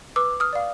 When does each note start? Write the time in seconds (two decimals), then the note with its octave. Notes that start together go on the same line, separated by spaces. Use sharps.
0.16 B4 D6 E6
0.40 D#6 F6
0.53 D5 F5